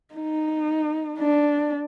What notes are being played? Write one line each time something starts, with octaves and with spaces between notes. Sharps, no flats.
D#4
D4